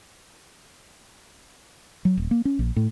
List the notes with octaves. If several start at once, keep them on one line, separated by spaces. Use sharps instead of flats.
F#3
D#1
A#3
C#4
A#1
A2